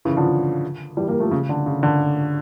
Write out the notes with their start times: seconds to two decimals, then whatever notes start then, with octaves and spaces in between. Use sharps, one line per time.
0.05 C#3 E3
0.17 D3 F3
0.97 E3 G3
1.08 G3 A#3
1.20 F3 A3
1.31 C#3
1.49 D3
1.66 C#3
1.83 D3